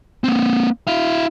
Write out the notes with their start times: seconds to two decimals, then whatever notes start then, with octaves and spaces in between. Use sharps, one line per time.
0.24 A#3 C4
0.87 E4 F5